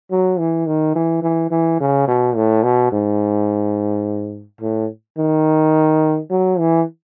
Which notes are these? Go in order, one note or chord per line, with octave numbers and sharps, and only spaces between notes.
F#3
E3
D#3
E3
E3
E3
C#3
B2
A2
B2
G#2
A2
D#3
F#3
E3